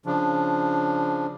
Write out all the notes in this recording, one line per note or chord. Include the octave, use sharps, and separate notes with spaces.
C#3 F3 D4